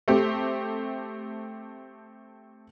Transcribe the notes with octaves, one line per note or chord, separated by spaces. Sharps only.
A3 C4 G4